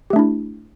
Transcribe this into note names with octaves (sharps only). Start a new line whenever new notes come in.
A3 D4 E4 G4